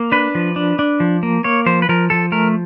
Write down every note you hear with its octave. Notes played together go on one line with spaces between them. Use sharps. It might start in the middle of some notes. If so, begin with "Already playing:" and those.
Already playing: A#3
D4 B4
F3
D4
D4
F3
A#3
A#3 C#5
F3 C5
B4
F3 A#4
F3 A4
A3 A#4